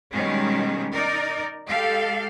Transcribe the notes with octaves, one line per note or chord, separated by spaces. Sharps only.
B2 D#3 G3 G#3 C#4
D#4 A#4 D5
G#3 G4 A4 F5